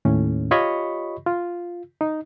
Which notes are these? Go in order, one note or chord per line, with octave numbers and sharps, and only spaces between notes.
D#2 A2 C#4
F4 G4 C#5 D#5 B5 C#6
F4
D#4